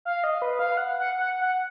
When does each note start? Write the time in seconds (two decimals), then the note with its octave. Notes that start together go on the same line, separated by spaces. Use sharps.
0.05 F5
0.24 D#5
0.42 B4
0.59 F5
0.77 F#5
0.99 F#5
1.19 F#5
1.41 F#5